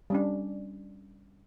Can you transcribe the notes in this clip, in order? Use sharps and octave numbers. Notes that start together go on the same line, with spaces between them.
G3 C#4 D4